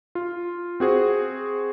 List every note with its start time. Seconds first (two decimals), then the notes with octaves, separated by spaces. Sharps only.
0.15 F4
0.80 C4 F#4 G#4 C5